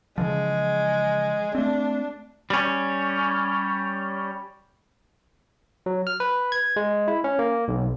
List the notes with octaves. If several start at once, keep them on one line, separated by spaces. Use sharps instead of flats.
C#3 E3 F3 G#3
A3 C4 D4
G3 C#4
F#3
F6
B4
G#6
G#3
E4
C#4
A#3
B1